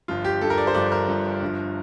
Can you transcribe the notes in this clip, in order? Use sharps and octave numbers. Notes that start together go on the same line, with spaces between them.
G1 G2 F3 F4
G4
G1 G2 F3 A4
A#4
D5
C5
G1 G2 F3 D5
A#4
G1 G2 F3
G1 G2 F3